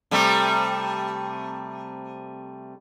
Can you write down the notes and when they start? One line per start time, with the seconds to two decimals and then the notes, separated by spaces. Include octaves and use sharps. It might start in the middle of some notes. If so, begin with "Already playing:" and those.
0.11 C3 G3 A3